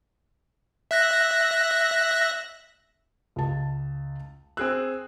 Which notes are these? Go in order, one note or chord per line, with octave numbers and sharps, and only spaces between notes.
E5 F#6 A#6
C#2 A5
C4 G#4 E6 F#6